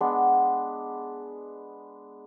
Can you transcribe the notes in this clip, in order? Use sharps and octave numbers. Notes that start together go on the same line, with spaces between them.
G#3 B3 D4